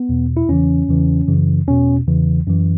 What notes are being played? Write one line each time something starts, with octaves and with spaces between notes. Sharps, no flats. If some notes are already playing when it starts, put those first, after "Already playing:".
Already playing: B3
E2 B2
E4
E2 C#3 E3 C#4
E2 C#3 E3
F#2 C#3 E3
E2 B2 C#4
E2 C#3 E3
F#2 E3